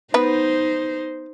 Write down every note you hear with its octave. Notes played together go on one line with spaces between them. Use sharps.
B3 D#4 B4 C5